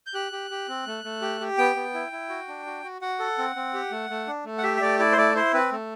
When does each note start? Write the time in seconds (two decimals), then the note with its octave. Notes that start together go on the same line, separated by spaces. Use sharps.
0.06 G6
0.14 G4 F#6
0.32 G4
0.51 G4
0.68 C4
0.86 A3
1.04 A3
1.22 G4
1.41 G4
1.58 B3 G5
1.76 B3
1.94 E4
2.12 E4
2.29 F#4
2.48 D4
2.66 F#4
2.84 F#4
3.02 F#4 F#5
3.19 A4
3.38 C4
3.56 C4
3.74 G4
3.91 A3
4.10 A3
4.27 D4
4.45 A3
4.58 F#5
4.63 G4 E5
4.77 E5
4.81 A3 D5
4.99 E4 D5
5.12 C5
5.17 A3 D5
5.35 E4 C5
5.53 C4 B4
5.72 A3